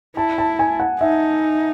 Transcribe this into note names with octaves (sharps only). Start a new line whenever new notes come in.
E4 A5
A5
G#5
F#5
D#4 E5